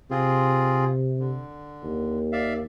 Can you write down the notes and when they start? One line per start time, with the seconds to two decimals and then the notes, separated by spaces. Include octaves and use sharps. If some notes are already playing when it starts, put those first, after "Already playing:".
0.11 C3 C4 F4 G#4
1.20 D3
1.83 D#2
2.32 D5 E5 F5